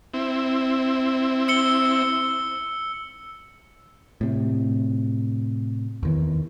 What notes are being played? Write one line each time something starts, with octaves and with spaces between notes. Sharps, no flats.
C4 E4
E6 C#7 G7
A2 C3
E2 D#3 E3